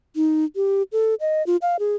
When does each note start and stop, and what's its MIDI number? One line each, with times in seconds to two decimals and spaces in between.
0.16 0.45 63
0.56 0.83 67
0.92 1.15 69
1.20 1.45 75
1.46 1.57 65
1.62 1.77 77
1.79 1.96 68